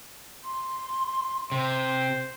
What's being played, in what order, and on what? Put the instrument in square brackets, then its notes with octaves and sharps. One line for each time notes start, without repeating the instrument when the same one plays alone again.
[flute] C6
[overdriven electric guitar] C3 [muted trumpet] C5